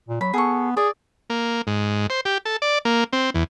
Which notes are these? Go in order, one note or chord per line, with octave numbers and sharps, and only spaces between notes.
A#2
F#3 B5
B3 G#4 A4 C#6
G#4 D5
A#3
G#2
C5
G4
A4
D5
A#3
C4
E2